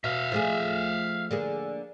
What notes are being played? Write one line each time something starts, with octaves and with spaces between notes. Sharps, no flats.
B2 E5 F5
F3 A3 G#4
D3 A#3 G#4